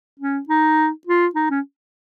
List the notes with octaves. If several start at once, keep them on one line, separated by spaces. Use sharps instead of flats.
C#4
D#4
F4
D#4
C#4